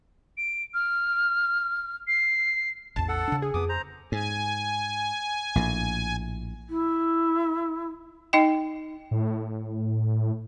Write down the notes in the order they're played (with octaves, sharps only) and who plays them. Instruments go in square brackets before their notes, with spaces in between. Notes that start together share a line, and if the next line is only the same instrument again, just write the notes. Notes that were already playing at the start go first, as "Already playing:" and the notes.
[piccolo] D7
F6
C7
[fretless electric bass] A1 E2 [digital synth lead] A5
[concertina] A4 F#5
[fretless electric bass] C#3 D4
[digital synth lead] G#4
[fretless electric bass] F2 [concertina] B3 D6 D#6
[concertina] C5 A#5
[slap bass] G#2 [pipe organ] G#5
[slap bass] A#1 A2
[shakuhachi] E4
[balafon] D#4 D#5 G5
[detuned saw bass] A2